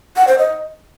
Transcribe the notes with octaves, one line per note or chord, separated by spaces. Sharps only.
F#5
C5
D#5